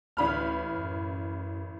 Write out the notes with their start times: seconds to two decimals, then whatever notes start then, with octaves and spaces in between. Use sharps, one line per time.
0.17 A1 D2 B5 F6
0.75 F#2